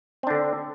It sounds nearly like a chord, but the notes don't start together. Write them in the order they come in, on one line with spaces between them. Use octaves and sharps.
C4 D4 D3